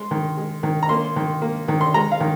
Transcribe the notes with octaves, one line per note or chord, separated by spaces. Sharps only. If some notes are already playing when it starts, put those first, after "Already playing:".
Already playing: G#3 C6
D#3
G#3
D#3
A#5
A#3 C6
D#3
A#3
D#3
C6
G#3 A#5
F5
D#3